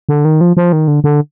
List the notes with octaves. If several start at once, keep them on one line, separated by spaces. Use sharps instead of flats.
D3
D#3
F3
F3
D#3
D3
D3